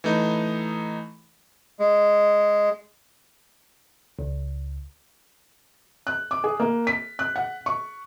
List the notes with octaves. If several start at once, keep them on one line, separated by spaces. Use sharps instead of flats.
E3 A3 D#4
G#3
C#2
F#6
D6
G#4
A#3
B6
F#6
F#5
C#6